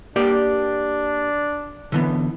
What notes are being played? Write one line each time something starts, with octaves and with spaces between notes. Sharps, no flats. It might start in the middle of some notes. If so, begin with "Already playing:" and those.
A#3 D4 G4 D5
D3 E3 B3